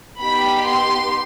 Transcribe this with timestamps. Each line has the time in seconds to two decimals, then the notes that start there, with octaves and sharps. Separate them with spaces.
0.19 B3 D#4 G4 B5
0.66 C6